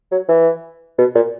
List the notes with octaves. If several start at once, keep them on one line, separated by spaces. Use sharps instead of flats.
F#3
E3
B2
A#2